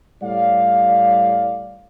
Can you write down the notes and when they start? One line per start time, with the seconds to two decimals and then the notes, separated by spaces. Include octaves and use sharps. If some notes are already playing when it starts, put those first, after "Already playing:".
0.22 A2 G3 D5 F5